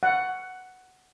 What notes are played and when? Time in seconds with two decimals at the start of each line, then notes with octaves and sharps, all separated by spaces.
0.03 F#5